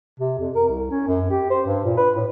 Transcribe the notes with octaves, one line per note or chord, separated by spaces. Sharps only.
C3
F2
A#4
C2
C#4
F#2
G4
C5
G2
A#2
B4
A2